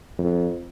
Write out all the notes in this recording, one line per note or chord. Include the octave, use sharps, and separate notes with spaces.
F2